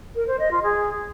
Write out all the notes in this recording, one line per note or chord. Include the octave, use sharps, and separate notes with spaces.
A#4
C5
D#5
F4
G#4